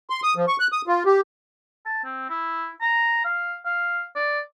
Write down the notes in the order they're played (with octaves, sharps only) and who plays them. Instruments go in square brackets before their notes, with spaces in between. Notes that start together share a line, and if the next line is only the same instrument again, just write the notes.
[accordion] C6
D#6
F3
C#6
F#6
D#6
F4
G4
[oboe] A5
C4
E4
A#5
F5
F5
D5